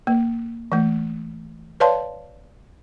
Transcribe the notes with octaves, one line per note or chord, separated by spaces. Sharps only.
A#3
E3 A3
B4 C#5 D5 F5 A5 C6